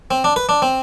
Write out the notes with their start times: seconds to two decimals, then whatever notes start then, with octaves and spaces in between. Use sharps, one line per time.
0.11 C4
0.24 D4
0.36 B4
0.49 D4
0.62 C4